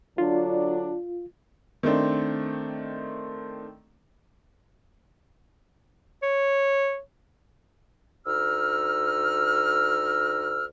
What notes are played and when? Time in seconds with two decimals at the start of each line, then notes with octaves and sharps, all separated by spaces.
0.18 D3 F#3 D4 F4
1.83 D#3 A3 C4 D4
6.23 C#5
8.26 D2 D#4 E6 F6